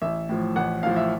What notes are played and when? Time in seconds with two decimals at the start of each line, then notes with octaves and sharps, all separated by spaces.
0.02 A1 E5
0.29 A2 F3
0.56 A1 F#5
0.83 A2 F3 F5
0.96 E5